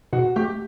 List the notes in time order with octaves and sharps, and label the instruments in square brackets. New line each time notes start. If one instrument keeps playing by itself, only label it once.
[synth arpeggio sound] B2 [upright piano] F#4
[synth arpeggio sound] A3 [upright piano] G4